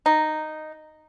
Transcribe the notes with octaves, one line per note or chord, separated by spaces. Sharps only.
D#4